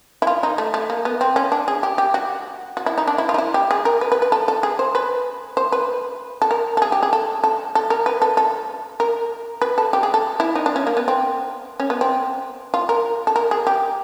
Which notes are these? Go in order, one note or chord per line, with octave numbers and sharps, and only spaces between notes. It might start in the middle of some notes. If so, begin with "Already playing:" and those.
E4
F4
D#4
A3
A3
A#3
B3
C4
C#4
D4
G#4
G4
G4
F#4
F#4
E4
D#4
D4
E4
F4
D#4
E4
G4
G#4
A#4
B4
B4
B4
A4
A4
G#4
C5
B4
C5
B4
A4
A#4
A4
G#4
G4
G#4
A4
A4
A4
A#4
B4
A4
A4
A#4
B4
A4
G4
G#4
A4
E4
D#4
D4
C#4
A#3
B3
C4
C#4
B3
C4
F4
A#4
A4
A#4
G#4
G4